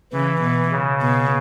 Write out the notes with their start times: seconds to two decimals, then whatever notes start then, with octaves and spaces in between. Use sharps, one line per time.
0.12 C#3 E3
0.42 B2
0.72 C#3
1.01 B2